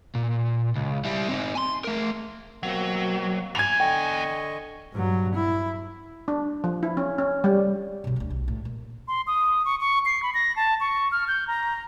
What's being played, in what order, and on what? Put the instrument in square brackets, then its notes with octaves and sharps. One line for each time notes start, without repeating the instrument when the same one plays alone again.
[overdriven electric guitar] A#2
C#2
G3 E4
C4 D#4
G#5 C6
A3 A#4
[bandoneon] B2 A#3 C4 [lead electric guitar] F#3
[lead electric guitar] E2 G#5 [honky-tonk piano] G#6 F7
[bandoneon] D3 D#5 C#6 [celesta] G5
[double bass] G2 F#3
E4
[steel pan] D4
F3
E4
C#4
C#4
G3
[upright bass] B1 B2
D2 A3
B1
A2
A#2
[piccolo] C6
D#6
C#6
C#6
C7
B5
A#6
A5
C#6
F6
G6
A#5